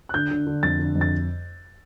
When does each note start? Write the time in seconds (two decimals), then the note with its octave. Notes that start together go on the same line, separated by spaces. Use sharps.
0.09 F#6
0.14 D3 G6
0.31 D3
0.47 D3
0.63 F2 A6
0.79 D3
0.95 F2
1.01 A6